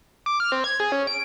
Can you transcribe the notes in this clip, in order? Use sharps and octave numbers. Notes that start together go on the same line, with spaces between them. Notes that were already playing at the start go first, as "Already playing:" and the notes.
D6
F6
C4
G#6
G#4
C#4
D7